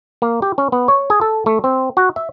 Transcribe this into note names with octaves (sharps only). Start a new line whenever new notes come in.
A#3
G4
C#4
B3
C#5
G#4
A4
A3
C4
F#4
E5